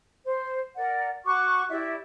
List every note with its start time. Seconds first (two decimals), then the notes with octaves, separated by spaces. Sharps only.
0.24 C5
0.76 A#4 D5 F#5
1.25 F#4 C#6 D6
1.70 E4 G4 D5 E5